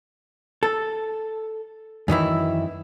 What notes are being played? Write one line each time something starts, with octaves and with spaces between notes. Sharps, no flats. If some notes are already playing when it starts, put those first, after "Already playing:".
A4
F#2 D#3 E3 E4